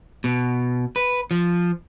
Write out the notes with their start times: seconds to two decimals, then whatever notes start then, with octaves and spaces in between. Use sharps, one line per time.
0.24 B2
0.96 B4
1.31 F3